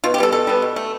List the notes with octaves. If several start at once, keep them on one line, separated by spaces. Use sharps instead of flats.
B2 F4
G4
G3 B3 A4
B2 A4
G3 B3
B2
A3